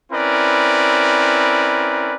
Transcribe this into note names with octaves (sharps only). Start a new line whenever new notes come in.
C4 C#4 E4 A#4 B4 D5